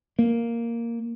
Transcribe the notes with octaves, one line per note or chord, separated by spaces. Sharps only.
A#3